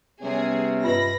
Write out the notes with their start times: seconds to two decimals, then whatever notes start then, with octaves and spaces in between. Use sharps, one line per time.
0.22 C3 G3 B3 C#4 G#4
0.84 G2 F4 B4 D#5 B5 A#6